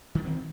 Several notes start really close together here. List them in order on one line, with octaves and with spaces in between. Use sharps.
D#3 G#3 E3 C4